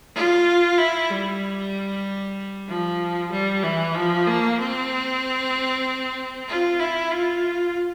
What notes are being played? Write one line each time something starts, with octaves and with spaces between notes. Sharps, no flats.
F4
E4
G3
F3
G3
E3
F3
A#3
C4
F4
E4
F4